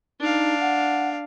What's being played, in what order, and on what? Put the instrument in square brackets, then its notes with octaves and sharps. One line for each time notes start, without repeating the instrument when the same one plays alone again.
[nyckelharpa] D4 F5 [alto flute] D#4
[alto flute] F#5